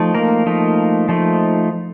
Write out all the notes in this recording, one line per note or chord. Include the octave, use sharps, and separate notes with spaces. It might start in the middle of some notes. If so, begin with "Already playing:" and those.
Already playing: F3 A3 D#4
A#3 A#4
F3 A3 D#4
F3 A3 D#4